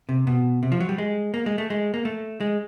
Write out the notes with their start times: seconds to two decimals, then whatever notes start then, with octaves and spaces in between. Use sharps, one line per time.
0.09 C3
0.27 B2
0.63 C3
0.72 F3
0.80 F#3
0.89 G3
0.98 G#3
1.34 A#3
1.46 G#3
1.58 A3
1.70 G#3
1.94 A#3
2.05 A3
2.41 G#3